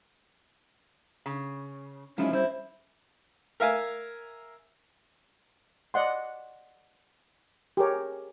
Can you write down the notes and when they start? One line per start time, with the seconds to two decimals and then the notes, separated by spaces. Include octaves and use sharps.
1.26 C#3
2.18 F3 F#3 G#3 C#4 D#4 E4
2.33 G3 C#4 E4 C5
3.60 A#4 E5 F5 G#5
5.94 D5 D#5 F#5 C6
7.77 G4 G#4 A#4 C#5